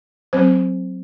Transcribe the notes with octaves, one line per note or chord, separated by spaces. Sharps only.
F#3 C4 C5